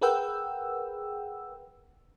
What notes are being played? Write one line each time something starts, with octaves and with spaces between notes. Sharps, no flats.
G#4 A#4 B4 F#5 G5 E6